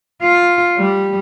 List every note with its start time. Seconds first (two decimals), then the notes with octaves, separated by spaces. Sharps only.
0.22 F4
0.78 G3